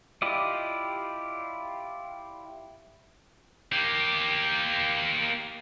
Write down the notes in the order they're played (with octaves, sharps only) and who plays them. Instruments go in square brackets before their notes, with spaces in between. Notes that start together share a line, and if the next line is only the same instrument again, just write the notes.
[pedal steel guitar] E4 F4 G4 D5 D#5
[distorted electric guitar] A#3 G4